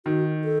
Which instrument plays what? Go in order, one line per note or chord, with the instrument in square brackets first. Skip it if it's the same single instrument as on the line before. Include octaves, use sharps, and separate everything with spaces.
[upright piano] D#3 [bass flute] F#4
[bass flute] A4